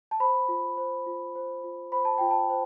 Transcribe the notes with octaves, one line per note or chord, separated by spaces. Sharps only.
A5
C5 B5
F4
C5
F4
C5
F4
C5 B5
A5
F4 G5
A5
C5